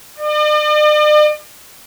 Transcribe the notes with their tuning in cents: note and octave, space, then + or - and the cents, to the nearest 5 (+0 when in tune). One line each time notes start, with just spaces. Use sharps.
D5 +45